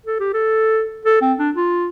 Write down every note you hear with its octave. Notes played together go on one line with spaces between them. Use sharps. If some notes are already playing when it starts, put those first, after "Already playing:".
A4
G4
A4
A4
C4
D4
F4